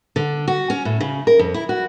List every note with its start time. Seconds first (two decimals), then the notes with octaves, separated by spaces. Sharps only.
0.16 D3
0.48 F#4
0.70 C#4
0.85 A2
1.00 C#3
1.27 A#4
1.39 F2
1.54 E4
1.69 F#4